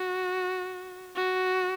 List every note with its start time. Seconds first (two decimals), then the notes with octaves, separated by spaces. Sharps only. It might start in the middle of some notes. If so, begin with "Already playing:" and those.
Already playing: F#4
1.16 F#4